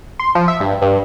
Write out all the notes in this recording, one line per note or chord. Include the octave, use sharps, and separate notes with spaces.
C6
F3
E5
G2
G2